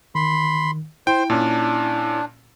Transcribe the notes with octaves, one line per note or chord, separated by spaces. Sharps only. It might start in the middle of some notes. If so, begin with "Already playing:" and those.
D#3 B5 C6
E4 C5 G5
A#2 C#4 D4